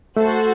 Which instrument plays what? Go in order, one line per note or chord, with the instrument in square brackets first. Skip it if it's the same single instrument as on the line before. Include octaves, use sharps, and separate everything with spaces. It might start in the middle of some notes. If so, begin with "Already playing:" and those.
[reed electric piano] A3 [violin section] F#4 A4 C5